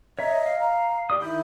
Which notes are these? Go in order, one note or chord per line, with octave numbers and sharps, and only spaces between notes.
C#5 D#5 E5 A#5
F5
A#5
G4 D5 D#6
D#3 E4 B5 G6